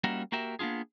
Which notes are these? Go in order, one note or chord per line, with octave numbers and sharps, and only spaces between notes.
G3 A#3 C#4 D#4 E4 F#4
A#3 F#4 G4 A#4 E5
A#3 B3 D4 F4 G#4